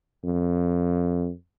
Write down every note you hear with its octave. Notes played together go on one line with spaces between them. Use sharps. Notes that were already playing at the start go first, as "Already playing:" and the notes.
F2